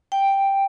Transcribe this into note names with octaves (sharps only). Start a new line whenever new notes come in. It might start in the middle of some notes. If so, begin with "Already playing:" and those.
G5